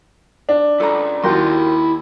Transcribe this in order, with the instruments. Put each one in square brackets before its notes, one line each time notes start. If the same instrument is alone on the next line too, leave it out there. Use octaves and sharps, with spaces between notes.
[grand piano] D4
[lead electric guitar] C#2 [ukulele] A4 A#5
[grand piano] D#2 [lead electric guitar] E4 C6 [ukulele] F#4 G4 A#4